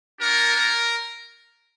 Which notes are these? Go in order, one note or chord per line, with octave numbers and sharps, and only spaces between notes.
A#3 D4 F#4 A#4
A#4